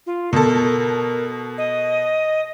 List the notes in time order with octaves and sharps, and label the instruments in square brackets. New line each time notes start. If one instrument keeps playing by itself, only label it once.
[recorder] F4
[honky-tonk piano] B2 A4 [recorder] A#4
[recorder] D#5